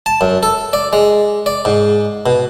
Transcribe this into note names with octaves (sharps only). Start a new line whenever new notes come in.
A5
F#2
A4
D5
G#3
D5
G#2
B2